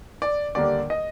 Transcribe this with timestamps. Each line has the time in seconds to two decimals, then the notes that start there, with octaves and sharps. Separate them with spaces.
0.22 D5
0.55 D#2 D3 G3 A#3 D5
0.90 D#5